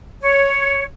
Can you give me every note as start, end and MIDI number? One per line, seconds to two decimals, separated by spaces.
0.22 0.83 73